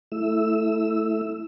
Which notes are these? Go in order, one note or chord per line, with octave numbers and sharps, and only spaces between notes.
A3 E4 E6